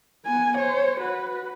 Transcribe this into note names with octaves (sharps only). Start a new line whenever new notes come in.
B3 G#5
C5 C#5
F#4 B4